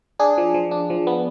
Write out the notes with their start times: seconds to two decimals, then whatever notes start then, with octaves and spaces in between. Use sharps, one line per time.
0.19 D4 G#4
0.38 F3
0.54 F3
0.71 D4
0.90 F3
1.07 B3